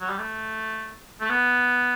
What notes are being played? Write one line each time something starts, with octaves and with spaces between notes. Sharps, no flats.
F#3
G3
A3
A3
B3